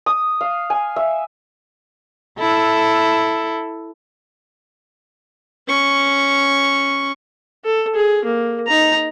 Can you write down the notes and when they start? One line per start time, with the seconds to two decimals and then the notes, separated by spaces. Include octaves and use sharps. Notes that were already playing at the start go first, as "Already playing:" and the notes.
0.06 D#6
0.41 F5
0.70 G#5
0.96 E5
2.39 E4 A4
5.67 C#4 C#6
7.65 A4
7.96 G#4
8.25 A#3
8.68 D#4 A#5